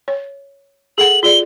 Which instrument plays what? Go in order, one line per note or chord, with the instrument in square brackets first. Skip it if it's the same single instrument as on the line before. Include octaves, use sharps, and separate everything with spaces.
[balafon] C#5
[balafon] G#4 A4 F#5 [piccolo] F#7
[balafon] F4 G#4 D5 [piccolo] G7